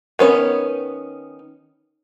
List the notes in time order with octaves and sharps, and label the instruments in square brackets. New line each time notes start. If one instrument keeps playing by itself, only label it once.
[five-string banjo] D#3 B3 C#4